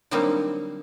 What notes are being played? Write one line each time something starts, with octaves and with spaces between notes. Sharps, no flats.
D3 F#3 G3 A#3 C4 D#4